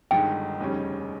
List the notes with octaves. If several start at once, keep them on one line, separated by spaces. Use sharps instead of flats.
G1 G2 D#3 G#3 D#4 G5
F1 D#2 C#3 G3 C#4